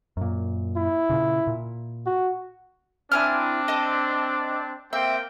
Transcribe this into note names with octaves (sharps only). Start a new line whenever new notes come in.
F#2 A#2
E4
A#2 C#3
A#2
F#4
C4 D4 E4 G#5 F6
A4 D#5
A#3 C4 E5 G5